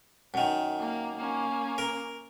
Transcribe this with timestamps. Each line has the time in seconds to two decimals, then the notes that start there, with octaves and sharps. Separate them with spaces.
0.34 F#2 D#3
0.80 A#3
1.16 A#3 C#4
1.78 A#4